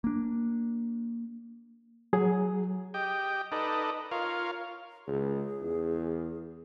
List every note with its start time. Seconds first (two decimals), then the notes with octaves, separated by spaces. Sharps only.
0.04 A#3 D4
2.13 F#3 G#4
2.94 G4 D#5 G5
3.52 D#4 A4 B4 D5 D#5
4.11 F4 A#4 C#5 F5
5.07 C#2 G#4
5.62 E2